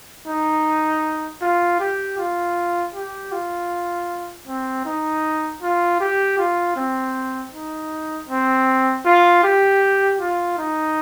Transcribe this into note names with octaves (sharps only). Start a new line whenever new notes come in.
D#4
F4
G4
F4
G4
F4
C4
D#4
F4
G4
F4
C4
D#4
C4
F4
G4
F4
D#4